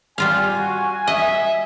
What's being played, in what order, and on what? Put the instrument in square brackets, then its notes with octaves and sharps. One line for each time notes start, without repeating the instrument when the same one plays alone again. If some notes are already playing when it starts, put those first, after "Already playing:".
[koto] G3 F4 F5 [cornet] G#5
[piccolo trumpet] F#4
[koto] D#5 [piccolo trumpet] E5